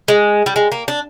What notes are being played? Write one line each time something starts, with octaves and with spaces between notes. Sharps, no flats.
G#3
G3
G#3
A#3
D4